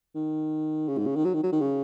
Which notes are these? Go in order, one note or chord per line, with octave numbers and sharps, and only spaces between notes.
D#3
C#3
G#2
C#3
D#3
F#3
D#3
F#3
D#3
C#3